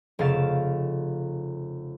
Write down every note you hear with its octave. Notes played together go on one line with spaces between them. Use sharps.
F1 C#3 F5 A6 E7